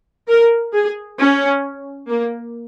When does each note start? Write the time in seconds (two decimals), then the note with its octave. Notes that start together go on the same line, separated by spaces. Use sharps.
0.28 A#4
0.73 G#4
1.18 C#4
2.09 A#3